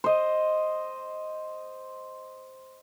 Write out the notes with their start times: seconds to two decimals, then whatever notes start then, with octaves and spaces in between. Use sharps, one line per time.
0.04 C5 D#5